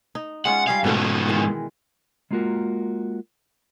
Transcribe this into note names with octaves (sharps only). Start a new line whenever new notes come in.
D#4
G#3 C#4 F4 F#5
G3 C#4 G#4 F5
G#2 B2 A3 B3 F5
D#3 E3 G#3
G#3 A#3 B3 F4 F#4 A#4